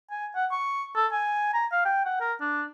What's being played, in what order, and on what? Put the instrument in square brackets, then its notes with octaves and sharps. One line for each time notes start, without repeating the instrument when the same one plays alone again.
[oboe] G#5
F#5
C#6
A4
G#5
A#5
F5
G5
F#5
A#4
D4